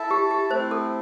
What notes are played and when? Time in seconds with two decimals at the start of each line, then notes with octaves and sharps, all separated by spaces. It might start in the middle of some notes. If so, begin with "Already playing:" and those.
Already playing: E4 A4 E5 A5
0.11 G4
0.31 G4
0.51 A3 C4 E4 C5
0.71 A4